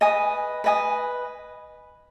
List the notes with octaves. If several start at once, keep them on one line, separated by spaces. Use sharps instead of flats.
B4 D#5 G#5 D#6
B4 D#5 G#5 D#6